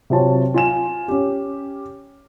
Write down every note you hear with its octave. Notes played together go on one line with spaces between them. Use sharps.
C3 F#3 C4 F4 C#5 A5
F4 G#5 E7
C#4 G4